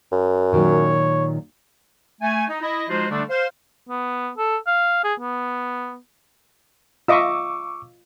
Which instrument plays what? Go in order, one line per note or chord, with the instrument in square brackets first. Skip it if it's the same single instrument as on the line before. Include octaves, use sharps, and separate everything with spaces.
[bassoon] F#2
[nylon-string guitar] A#2 D#3 F#3 [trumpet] C#5
[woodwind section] A3 G#5
D#4
E4 D#5
F3 G#3 D#4 F4 F#4 C5
D3 G3 A3 D4
C5 F5
[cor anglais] B3
A4
F5
G#4
B3
[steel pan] F4 D#5 E5 [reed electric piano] C#6 D6 E6